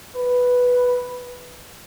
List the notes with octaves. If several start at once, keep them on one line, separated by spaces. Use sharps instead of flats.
B4